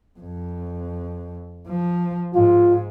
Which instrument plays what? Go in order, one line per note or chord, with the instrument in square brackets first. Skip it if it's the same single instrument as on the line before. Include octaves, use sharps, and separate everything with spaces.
[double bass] F2
F3
[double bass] G#2 [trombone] F4